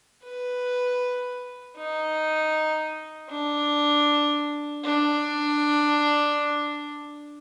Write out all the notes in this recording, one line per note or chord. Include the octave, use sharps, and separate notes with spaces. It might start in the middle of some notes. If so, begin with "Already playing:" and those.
B4
D#4
D4
D4